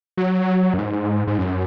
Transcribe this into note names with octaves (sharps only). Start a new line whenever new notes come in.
F#3
F#2
G#2
G#2
F#2